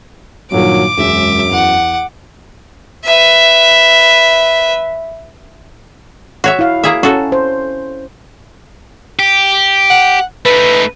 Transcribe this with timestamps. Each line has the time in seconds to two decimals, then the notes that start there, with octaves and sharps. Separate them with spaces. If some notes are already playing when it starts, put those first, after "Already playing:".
0.52 G2 A#2 D#3 F#3 D6
0.98 E1 F#2 G#3 E5
1.51 E2 F#5
3.04 B4 E5
6.44 F#4 C#5 E5
6.59 E4 F5
6.83 A#3 G#4 E5
7.03 C#4 F#4 A4
7.32 C5
9.19 G4
9.90 F#5
10.46 A3 D#4 B4